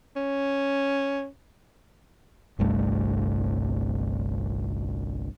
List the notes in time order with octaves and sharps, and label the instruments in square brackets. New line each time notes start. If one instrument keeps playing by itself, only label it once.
[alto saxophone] C#4
[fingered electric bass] G1 C2 G2 A3